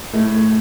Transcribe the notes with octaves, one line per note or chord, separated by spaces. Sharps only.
A2 A3